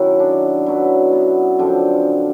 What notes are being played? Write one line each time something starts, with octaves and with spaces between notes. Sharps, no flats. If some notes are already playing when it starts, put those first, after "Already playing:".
Already playing: F#2 D#3 F#3 E4
D4
B2 F#3 E4
B3
F#2 D3 F3 C4